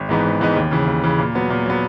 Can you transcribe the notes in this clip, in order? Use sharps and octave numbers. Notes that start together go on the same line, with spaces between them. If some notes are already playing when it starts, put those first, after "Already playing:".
Already playing: G#1
G#2 E3 B3 D#4
G#1
G#2 E3 B3 D#4
D#2
C#3 E3
D#2
C#3 E3
A#2
F#3 B3
A#2
F#3 B3